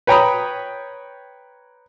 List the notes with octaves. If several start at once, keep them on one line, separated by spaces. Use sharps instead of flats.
B4 C#5 G5 A#5 B5 D#6